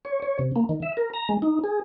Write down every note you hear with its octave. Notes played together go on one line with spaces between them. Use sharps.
C#5
C#5
C3
A#3
D#3
E5
A#4
A#5
G#3
D#4
G#4